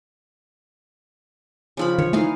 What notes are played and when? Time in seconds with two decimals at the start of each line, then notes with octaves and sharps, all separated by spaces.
1.77 C#3 F3 B5
1.98 D#3 C#5
2.13 E3 A3 D#4 F5